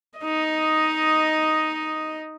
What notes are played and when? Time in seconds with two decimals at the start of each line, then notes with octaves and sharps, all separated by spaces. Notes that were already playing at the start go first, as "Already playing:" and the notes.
0.20 D#4 D#5